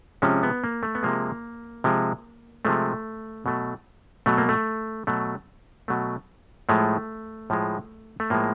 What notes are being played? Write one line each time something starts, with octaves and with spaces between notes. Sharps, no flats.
C3 F3 G#3 C#4
B3
A#3
A3
B3
C3 F3 G#3 A#3
C3 F3 G#3
C3 F3 G#3 A3
B2 F#3 A3
B2 F#3 A3
A#3
A3
B2 F#3 A3
B2 F#3 A3
A2 F3 G#3 A3
A2 F3 G#3
A3
A2 F3 G#3 A#3